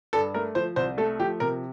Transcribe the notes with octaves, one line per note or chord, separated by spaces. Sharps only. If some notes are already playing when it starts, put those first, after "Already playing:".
G2 A4
A3 A#4
F3 C5
C2 C5
A3 A4
F3 G4
C3 A#4